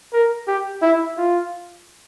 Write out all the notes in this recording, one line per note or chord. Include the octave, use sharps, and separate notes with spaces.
A#4
G4
E4
F4